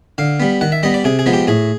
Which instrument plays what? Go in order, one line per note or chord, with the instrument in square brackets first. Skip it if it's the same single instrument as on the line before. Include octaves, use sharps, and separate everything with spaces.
[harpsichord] D3 F5
G3 B3
D#3 F#5
E5
G3 B3 D#5
D5
C3 G#4
G#4
F3 G#3 B3
G4
A2 G#4